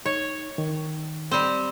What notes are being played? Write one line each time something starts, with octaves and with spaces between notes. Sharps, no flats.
D#4 C#5
D#3
G3 C4